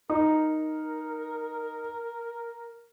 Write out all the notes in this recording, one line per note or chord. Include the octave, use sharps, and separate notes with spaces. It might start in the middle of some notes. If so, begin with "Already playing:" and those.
D#4 A#4